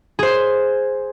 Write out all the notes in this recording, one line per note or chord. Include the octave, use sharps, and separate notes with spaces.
G#4 C5